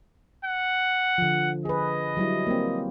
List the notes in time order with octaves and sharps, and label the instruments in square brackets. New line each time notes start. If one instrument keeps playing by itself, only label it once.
[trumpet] F#5
[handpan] D3 F3
[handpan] G#4 B4 [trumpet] D#5
[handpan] F#3 G3 E4
A#3 C4